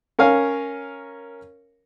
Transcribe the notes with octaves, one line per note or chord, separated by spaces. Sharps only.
C#4 A#4 C#5 F5 G#5